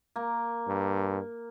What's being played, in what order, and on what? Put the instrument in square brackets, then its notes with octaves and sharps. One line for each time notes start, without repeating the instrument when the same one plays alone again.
[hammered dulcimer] A#3
[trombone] G2